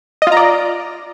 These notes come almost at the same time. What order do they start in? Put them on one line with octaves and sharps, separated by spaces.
D#5 F4 A#5 D5